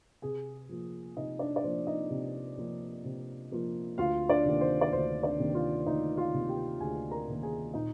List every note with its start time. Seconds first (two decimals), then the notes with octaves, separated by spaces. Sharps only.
0.22 C3 G#4 G#5
0.69 F3 A#3 F4
1.17 C3 D#4 D#5
1.39 D4 D5
1.56 D5
1.64 F3 A#3 F4 C5
1.87 D#4 D#5
2.10 C3
2.57 F3 A#3 F4
3.05 C3
3.51 F3 A#3 F4
3.98 D2 F4 F5
4.29 D4 D5
4.45 C3 D#3 A#3
4.61 C5
4.81 D5
4.93 D2 C5
5.23 D4 D5
5.39 C3 D#3 A#3
5.55 F4 F5
5.86 D2 D#4 D#5
6.17 F4 F5
6.33 C3 D#3 A#3
6.49 G4 G5
6.80 D2 G#4 G#5
7.11 A#4 A#5
7.28 C3 D#3 A#3
7.43 G#4 G#5
7.74 A#2 D#4 D#5